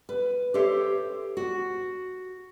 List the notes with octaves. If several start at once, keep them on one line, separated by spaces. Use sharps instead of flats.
B4
G4 A4 C5 C#5 E5
F#4